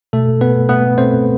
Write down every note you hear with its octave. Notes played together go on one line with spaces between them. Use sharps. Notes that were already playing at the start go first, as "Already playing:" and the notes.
B2 A3 A4
B2 B3 B4
A3 B3 B4
A3 C4 C5